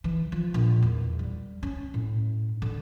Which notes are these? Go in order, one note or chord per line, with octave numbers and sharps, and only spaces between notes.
E3
F3
A#1
E2
G3
C#4
A2
D3